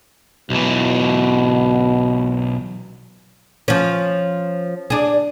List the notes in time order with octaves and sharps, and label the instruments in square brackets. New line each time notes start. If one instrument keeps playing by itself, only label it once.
[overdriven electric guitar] B1 E3 [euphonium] B2
[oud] F3 C#4
D4 G#4